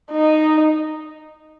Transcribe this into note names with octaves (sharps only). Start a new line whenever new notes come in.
D#4